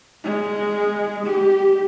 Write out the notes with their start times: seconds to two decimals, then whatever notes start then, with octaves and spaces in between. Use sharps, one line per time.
0.24 G#3
1.26 G4